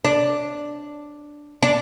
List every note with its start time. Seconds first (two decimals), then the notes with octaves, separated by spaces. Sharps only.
0.05 D4
1.63 D4